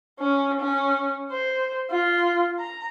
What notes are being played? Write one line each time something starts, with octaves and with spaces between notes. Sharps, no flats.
C#4
C#4
C5
F4
A#5